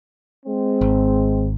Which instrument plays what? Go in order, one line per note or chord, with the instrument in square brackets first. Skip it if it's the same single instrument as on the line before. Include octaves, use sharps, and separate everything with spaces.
[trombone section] G#3 C4
[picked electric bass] G#1